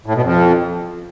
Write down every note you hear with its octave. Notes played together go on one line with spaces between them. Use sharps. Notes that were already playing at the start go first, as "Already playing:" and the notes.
A2
B2
F2